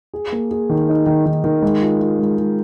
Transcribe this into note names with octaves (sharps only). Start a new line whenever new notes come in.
G#4
A#3
G#4
D#3
D#4
D#3
D#3
D#3
G#3
F4
F4
G#3
G#3